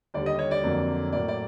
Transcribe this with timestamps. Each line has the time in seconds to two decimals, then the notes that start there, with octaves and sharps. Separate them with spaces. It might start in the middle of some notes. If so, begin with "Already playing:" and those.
0.14 D#2 D3 G3 D5
0.26 D#5
0.39 C#5
0.51 D5
0.63 F2 D3 F#3 A#3
1.12 A2 F#3 A#3 D5
1.28 D5